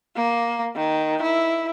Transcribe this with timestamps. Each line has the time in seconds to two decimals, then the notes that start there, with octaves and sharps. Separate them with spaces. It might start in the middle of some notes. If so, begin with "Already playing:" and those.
0.16 A#3
0.76 D#3
1.22 E4